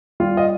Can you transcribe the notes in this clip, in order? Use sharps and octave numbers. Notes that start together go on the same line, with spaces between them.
G3 F4
D#5